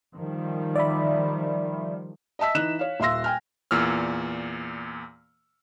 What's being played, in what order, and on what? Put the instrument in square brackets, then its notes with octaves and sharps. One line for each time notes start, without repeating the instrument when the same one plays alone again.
[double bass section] D#3 F3 G3
[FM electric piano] D5 E5 B5
[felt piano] D#5 E5 A5 E6 B6
E3 D#4 F#6 E7
C#5 F5
D#1 E5 F5 C6 E6 A#6
G5 G#5 F6
[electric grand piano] E2 A#2 E6 F6